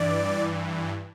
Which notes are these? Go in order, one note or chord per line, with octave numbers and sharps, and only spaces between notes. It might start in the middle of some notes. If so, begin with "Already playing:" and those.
Already playing: G2 E3 D5